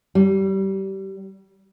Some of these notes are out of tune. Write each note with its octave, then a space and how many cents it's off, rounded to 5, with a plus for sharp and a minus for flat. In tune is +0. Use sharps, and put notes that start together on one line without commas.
G3 -25